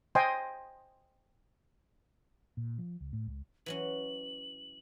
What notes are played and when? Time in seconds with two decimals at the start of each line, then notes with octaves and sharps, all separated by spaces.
0.15 C5 D#5 G5 G#5 C6
2.57 A#2
2.78 F3
3.00 C#2
3.13 A2
3.27 C#2
3.66 E3 F#3 C#4 F#7